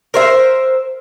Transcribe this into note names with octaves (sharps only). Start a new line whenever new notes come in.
A#4 C5 E5